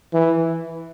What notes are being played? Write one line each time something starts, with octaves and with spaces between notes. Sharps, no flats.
E3